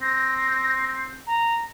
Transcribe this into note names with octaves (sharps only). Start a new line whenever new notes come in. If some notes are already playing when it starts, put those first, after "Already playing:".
C4 A#6
A#5